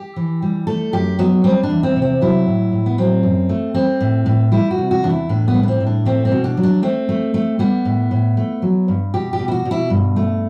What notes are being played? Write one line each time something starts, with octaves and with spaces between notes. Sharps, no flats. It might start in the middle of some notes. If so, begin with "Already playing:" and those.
Already playing: G4
E3
G3
A3 A4
F#2 G4
F#3 B3
G3 C4
D4
E2
C4
C3
C4
F#3 E4
A2
A2
B3
F#3 C4
F#2
A3
G3 C4
A2
A2
G3 E4
F#4
C3
F#4
E2 D4
E4
A2 D4
B3
G3
D4
C4
A2
D4
A3 C4
C4
B2
D4
F#3
D4
A3 C4
A3
A3
G3 B3
A2
A2
A3
F#3
G2
B2 G4
G4
B2
E4
F#4
B2
E4
G2
A3